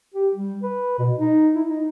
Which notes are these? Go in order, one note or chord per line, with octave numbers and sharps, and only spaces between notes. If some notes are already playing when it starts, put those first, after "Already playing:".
G4
G3
B4
B2
D#4
E4
D#4